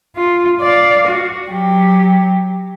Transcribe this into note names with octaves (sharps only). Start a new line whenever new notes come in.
F4
D5 F5
F#4
F#3 G4